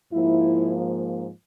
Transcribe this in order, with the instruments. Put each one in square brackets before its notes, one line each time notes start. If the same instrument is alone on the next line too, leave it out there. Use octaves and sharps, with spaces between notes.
[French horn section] G#2 F3 A#3 E4